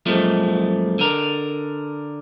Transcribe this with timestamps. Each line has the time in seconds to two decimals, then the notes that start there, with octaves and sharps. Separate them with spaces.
0.06 F#2 A#2 F3 G#3 A3
0.99 D3 A#4